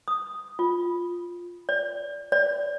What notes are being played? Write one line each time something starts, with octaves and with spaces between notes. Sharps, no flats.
D#6
F4
D5
D5